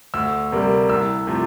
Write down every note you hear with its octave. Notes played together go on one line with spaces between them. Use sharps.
D2 E6
C3 G3 A#3
C2 E6
C3 F3 A3